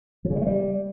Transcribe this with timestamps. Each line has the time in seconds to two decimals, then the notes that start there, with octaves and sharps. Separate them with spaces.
0.25 F3
0.30 C#3
0.36 G3
0.41 A3
0.47 G3